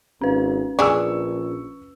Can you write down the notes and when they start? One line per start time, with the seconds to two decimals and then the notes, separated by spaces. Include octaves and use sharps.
0.21 G#1 C#4 B4
0.79 A#1 D4 G#4 C#6 E6